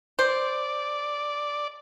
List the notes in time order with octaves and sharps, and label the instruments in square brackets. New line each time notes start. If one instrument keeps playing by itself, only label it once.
[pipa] C5 [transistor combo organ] D5